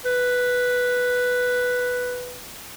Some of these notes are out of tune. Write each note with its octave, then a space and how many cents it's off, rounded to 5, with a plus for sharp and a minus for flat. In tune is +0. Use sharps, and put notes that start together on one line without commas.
B4 +0